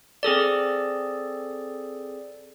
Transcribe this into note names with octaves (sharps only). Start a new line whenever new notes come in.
C4 G#4 A4 D5